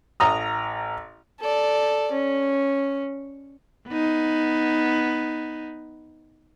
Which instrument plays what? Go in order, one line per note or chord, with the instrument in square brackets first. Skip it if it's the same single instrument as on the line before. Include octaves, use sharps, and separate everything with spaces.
[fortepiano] A1 A#5 D#6
[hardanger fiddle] A4 D5
C#4
[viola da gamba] B3 D#4